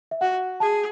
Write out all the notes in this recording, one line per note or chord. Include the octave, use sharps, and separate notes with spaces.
E5
F#4 F#5
G#4 A5